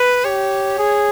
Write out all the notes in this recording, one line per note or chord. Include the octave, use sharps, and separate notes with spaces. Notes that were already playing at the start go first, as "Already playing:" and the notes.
Already playing: B4
G4 C#5
G#4